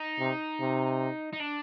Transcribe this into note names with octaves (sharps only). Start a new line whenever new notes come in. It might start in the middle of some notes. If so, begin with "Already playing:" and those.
Already playing: D#4
C3
C3
D#4
D4